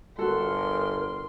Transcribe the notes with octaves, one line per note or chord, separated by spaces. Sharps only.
G1 F#4 A4 A#4 C6